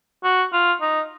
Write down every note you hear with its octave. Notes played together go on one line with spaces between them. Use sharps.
F#4
F4
D#4